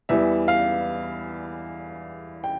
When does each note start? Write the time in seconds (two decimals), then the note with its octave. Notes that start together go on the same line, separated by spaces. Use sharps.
0.09 E2 E3 G3 E5
0.48 F5
2.44 G5